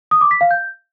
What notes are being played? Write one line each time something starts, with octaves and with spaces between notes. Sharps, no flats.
D#6
D6
B6
F5
G6